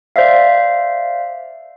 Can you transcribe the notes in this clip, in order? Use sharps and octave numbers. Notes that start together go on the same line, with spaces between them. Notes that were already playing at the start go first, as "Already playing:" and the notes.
C5 D5 E5 F5